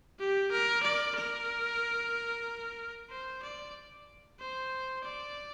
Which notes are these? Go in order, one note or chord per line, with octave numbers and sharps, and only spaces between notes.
G4
A#4
D5
A#4
C5
D5
C5
D5